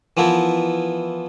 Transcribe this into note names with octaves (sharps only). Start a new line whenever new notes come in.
E3 F3 B3 E4 A#4